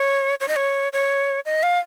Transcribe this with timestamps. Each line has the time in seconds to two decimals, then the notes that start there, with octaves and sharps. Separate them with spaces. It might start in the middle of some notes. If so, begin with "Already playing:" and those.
Already playing: C#5
0.40 C#5
0.48 D#5
0.56 C#5
0.93 C#5
1.46 D#5
1.63 F5